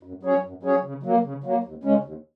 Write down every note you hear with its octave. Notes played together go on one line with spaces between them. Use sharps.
F#2
F#3 C#4 G#4 C#5
F#2
F#3 C#4 G#4 C#5
C#3
F#3 A#3
C#3
F#3 A#3
D#2
C#3 G#3 C#4
D#2